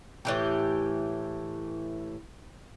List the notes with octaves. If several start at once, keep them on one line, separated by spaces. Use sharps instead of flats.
A2 E3 G4